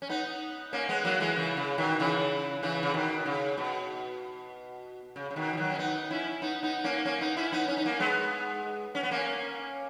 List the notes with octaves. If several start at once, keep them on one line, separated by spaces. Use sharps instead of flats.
C#4
B3 D#4
A#3 C#4
G#3 B3
F#3 A#3
E3 G#3
C#3 E3
C#3
B2 D#3
C#3 E3
C#3 E3
C#3
B2 D#3
C#3
B2
C#3
C#3
B2 D#3
E3
D#3 F#3
C#4
B3 D#4
C#4 E4
B3 D#4
B3 D#4
A#3 C#4
A#3 C#4
B3 D#4
C#4 E4
B3 D#4
C#4
D#4
A#3 C#4
G#3 B3
C#4
B3
A#3 C#4